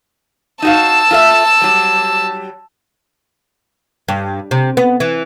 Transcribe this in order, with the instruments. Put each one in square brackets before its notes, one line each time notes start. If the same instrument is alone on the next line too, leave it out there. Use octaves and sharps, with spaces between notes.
[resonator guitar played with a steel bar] D#4 F#4 F5 [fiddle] A5 E6
[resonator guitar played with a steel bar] F4 A4 E5
F#3 G3
[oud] G2
C3
B3
E3